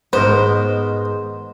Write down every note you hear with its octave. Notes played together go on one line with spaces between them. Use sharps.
G#2 B2 B3 A#4 C5